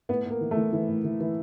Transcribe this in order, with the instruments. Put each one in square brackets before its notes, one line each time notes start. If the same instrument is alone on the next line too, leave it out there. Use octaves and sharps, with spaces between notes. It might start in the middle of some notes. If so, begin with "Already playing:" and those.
[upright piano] A2 B3
A2
A#3
E3
A3
E3
E3
A2
E3
E3